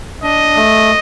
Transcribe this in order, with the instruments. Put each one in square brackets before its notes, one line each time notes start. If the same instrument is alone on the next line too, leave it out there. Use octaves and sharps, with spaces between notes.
[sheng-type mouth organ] D4 [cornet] D#5
[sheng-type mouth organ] A3